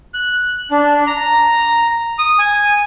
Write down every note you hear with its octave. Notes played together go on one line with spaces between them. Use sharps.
F#6
D4
A#5
D#6
G#5